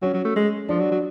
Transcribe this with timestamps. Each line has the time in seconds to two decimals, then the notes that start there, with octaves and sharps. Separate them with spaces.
0.02 F#3 C#4
0.13 F#3
0.25 A3
0.36 G#3
0.69 F3 D4
0.80 F#3
0.91 F#3